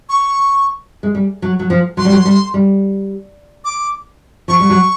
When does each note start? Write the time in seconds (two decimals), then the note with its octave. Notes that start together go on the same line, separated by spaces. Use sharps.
0.09 C#6
1.03 G#3
1.15 G3
1.42 F#3
1.59 F#3
1.70 F3
1.97 F#3 C6
2.05 G3
2.12 F#3
2.25 G3
2.54 G3
3.65 D6
4.48 F3 C#6
4.60 G3
4.70 F#3